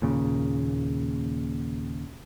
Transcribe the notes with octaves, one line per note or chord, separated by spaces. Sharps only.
D#2 A#2 C#3